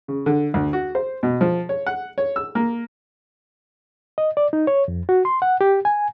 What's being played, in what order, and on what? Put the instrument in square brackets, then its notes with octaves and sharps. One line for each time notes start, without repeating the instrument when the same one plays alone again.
[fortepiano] C#3
D3
D2
F#4
C5
B2
F3
C#5
F#5
C#5
E6
A#3
[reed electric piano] D#5
D5
D#4
C#5
F2
F#4
C6
F#5
G4
G#5